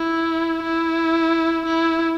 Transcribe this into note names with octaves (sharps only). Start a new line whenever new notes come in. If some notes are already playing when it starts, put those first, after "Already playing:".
Already playing: E4
E4
E4